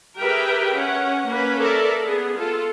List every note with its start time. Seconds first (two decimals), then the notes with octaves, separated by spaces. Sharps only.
0.19 G4 G#4 A#4 B4 E5 G5
0.73 C#4 F#5
1.28 A#3 C#4 B4
1.59 A4 A#4 D5 E5
2.03 B3 G#4
2.36 F4 A4